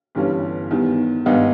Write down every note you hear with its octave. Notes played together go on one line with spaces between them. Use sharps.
G1 G2 E3 G3 C#4
E2 D#3 G3
G#1 G2 G3 B3 D#4